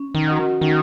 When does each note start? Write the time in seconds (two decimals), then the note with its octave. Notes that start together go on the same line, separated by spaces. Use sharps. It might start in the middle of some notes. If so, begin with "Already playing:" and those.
Already playing: C#4
0.15 D#3
0.27 F#4 A#4 D#5 F#5
0.61 D#3 C#4